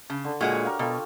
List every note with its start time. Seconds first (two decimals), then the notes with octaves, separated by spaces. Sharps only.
0.10 C#3 A5
0.24 D3
0.41 A#2 G#3 F#4 C#5 F#5
0.65 G4 A#4 F5
0.79 B2 F4 G4 A4